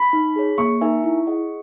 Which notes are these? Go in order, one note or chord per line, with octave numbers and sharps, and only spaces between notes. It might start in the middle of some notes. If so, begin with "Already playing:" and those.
Already playing: B5
D#4
G#4 C#5
A#3 C#6
D#4 A#4 E5 G#5
E4
G#4 D#5 F#5